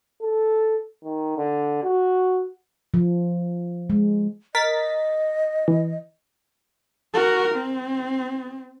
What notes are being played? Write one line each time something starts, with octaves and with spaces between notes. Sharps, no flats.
A4
D#3
D3
F#4
F3
G#3
A#4 D#5 A6 B6
E3
F#4 A#4
C4